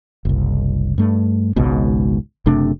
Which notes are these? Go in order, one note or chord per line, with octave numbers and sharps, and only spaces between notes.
F#1 C2
G2 A3
G#1 C#2 G#2 B2
F#1 C3 A3 D4